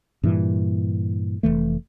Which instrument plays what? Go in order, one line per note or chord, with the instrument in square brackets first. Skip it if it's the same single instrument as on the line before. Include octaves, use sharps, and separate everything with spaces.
[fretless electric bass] G2 A#2 E3
F1 C#2 E3 A3